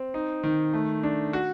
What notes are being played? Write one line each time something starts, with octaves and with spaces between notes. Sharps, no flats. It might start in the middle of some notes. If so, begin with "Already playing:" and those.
Already playing: C4
D#4
D#3
A3
D4
F#4